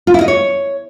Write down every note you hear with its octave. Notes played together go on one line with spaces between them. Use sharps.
F4
E4
D#5
C#5